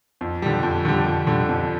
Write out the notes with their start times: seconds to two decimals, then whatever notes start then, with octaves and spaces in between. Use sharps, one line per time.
0.21 F2
0.42 D3 G3
0.63 F2
0.85 D3 G3
1.07 F2
1.27 D3 G3
1.49 F2